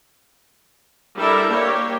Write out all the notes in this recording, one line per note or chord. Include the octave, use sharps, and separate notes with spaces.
G3 D4 E4 A4 A#4 E5
A#3 G4 C#5